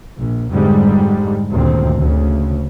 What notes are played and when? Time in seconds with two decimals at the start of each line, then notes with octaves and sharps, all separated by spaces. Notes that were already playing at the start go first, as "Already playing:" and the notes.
0.18 A#1
0.51 F2 G#2 D3 G3 G#3
1.51 D2 G2 A#2 D#3 C4
1.97 D2 C#3